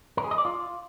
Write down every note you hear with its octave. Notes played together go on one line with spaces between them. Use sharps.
A#4
G#4
D#5
D5
F4